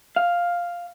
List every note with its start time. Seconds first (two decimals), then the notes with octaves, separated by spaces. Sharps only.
0.16 F5